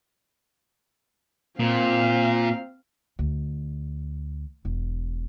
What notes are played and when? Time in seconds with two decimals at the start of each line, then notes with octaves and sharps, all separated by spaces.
1.60 A#2 C4 F5
3.19 D2
4.65 E1